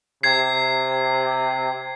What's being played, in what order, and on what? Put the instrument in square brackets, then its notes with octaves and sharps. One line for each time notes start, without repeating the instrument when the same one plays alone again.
[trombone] C3 [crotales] G#6 C7